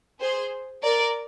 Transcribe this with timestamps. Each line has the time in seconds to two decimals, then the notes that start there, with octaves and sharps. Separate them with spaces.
0.20 G#4 C5
0.83 A#4 D5